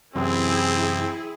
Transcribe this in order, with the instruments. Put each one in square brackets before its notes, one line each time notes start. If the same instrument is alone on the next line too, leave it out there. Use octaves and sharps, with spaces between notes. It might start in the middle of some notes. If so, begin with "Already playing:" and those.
[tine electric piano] F#2 C3 E3 [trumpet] C4 [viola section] E4 G#4